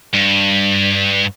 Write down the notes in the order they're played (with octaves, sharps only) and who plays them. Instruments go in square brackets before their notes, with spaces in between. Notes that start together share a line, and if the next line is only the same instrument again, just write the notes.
[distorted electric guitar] G2